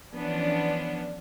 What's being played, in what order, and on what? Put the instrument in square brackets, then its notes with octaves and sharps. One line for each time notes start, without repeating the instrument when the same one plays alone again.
[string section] E3 F3 B3 C#4 D4